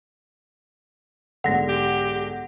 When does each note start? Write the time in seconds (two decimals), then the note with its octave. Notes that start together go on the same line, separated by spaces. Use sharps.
1.44 B1 G#2 D3 F#5 A#6
1.69 G4